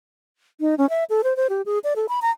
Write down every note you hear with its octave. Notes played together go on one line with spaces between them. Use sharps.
D#4
C#4
E5
A4
C5
C5
G4
G#4
D5
A4
B5
A#5